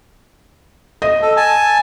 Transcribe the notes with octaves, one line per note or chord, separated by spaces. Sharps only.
D#5
A4
G#5 A5